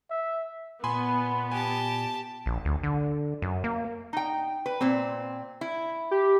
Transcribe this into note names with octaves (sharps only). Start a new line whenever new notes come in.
E5
A#2 B3 G#5 B5 C6
G4 G#5 A5
A#1
D2
D3
F#2
A#3
D#4 G5
B4
A#2 C4
E4
G4